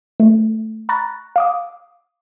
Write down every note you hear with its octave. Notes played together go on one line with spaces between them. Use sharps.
A3
A#5 B5 C#6 F#6 A6 A#6
F5 D6 D#6